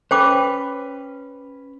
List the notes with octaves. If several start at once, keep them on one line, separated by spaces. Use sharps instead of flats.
C#4 B4 C5 G5 D6